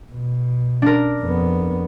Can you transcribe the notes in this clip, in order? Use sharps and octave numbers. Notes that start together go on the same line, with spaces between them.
B2
D4 A#4
F2 B3